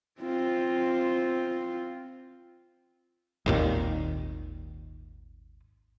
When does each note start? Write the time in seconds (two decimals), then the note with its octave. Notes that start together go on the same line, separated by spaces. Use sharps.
0.21 C4 F4
3.46 G#1 D#2 A#2 D#3